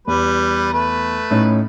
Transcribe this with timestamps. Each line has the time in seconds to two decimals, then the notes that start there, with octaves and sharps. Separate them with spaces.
0.07 E2 G3 B4
0.73 A3 B4
1.31 A2 C#4 D#4